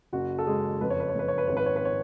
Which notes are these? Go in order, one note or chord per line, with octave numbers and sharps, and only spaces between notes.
F#1 F#4
A4
F#1 G#3 G#4
F2 B4
C#5
B4
C#5
F2 B4
C#5
B4
G#1 C#5
B4
C#5
B4
C#5